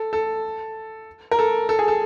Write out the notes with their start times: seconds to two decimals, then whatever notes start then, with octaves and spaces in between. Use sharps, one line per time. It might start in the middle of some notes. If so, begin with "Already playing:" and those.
Already playing: A4
0.13 A4
1.31 A#4
1.39 A4
1.69 A4
1.79 G#4
1.88 A4